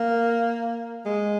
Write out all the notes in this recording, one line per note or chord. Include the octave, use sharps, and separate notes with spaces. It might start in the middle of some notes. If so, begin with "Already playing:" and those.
Already playing: A#3
G#3